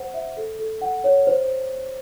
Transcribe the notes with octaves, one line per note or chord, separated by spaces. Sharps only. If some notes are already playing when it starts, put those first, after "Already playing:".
Already playing: C5 F#5
E5
A4
A4
F#5
C#5
C5